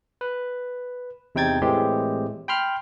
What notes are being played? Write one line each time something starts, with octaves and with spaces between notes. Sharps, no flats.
B4
E2 C3 D#4 G5 G#6 A6
A2 E3 G#3 A3 C4 G4
G5 B5 C6 F6